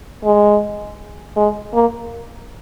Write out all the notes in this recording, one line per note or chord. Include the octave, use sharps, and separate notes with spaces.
G#3
G#3
A#3